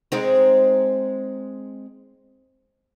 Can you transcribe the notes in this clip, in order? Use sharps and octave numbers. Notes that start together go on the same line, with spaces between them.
G#3 C4 D#4